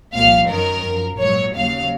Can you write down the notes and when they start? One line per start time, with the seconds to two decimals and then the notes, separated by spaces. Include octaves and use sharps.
0.14 C2 A#2 F3 F5
0.49 F#2 D#3 F#3 A#4
0.84 F#2 F3
1.20 A#1 G#2 F#3 C#5
1.55 D#2 C#3 F#3 F5